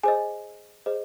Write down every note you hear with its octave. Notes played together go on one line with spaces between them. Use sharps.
G#4 C5 D#5 G#5
G#4 C5 D#5